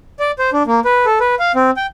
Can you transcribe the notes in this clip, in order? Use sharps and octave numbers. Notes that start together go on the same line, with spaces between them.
D5
C5
D4
A#3
B4
A4
B4
F5
C4
G5